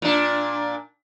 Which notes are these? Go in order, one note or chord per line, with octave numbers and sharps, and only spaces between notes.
A#2 D4